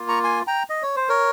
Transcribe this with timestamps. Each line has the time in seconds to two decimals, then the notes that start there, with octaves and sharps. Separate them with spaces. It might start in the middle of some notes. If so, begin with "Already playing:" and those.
Already playing: A#3 F4
0.08 A#5 C#6
0.24 G#5 C6
0.47 G5 A#5
0.70 D#5
0.83 C#5
0.96 C5
1.09 A#4 C#5